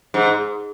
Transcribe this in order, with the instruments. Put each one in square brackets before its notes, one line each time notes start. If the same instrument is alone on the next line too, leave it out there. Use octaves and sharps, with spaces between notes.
[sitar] G#2